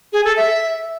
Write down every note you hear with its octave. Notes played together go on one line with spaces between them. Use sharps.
G#4
A4
E5